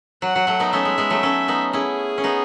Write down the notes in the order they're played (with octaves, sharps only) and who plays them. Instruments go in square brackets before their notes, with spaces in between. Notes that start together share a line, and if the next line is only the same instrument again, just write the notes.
[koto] F#3 [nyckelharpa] F#5
[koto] F#3
F#3 A3
B3 D#4
[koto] A3 C#4 [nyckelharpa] E5
[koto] G#3
G#3 B3
F#3 A3
A3 C#4
B3 D#4
[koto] C#4 E4 [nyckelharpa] G#4
[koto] C#4
B3 D#4